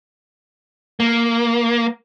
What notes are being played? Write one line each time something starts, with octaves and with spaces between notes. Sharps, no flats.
A#3